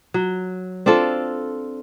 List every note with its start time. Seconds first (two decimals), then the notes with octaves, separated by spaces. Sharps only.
0.14 F#3
0.86 C4 D4 F4 A4